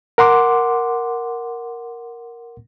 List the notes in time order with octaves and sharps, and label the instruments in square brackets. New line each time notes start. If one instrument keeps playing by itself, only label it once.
[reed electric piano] A#4 F#5 C6 D6